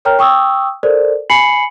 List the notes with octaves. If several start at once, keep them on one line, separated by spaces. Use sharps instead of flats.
A#4 C#5 G5 A#5 F6
G5 C#6 D#6 E6
A4 A#4 C5 D5
G#5 B5 C7 C#7 F#7